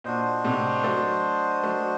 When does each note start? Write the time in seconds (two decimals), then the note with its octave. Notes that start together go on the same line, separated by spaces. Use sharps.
0.04 A#2 D4 F#4 C5 D#5
0.44 A2 C3
0.84 F#3 A3
1.63 F#3 A3